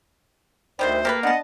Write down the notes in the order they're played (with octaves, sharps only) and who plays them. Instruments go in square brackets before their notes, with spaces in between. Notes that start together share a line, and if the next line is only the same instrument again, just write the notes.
[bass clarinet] D2 [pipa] D3 D#3 G3 [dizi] C5
[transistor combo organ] A#3 [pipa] G4 A4 B4
[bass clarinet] B3 [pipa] D4 A5 [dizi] D#5